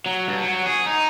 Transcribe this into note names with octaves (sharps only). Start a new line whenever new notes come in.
F#3
G2
F#3
G#4
D#4